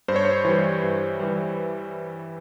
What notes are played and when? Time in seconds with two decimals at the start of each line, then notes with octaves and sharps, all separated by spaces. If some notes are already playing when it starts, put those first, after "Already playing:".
0.08 G2 C5
0.16 C#5
0.25 C5
0.45 E3 G3
0.83 G2
1.19 E3 G3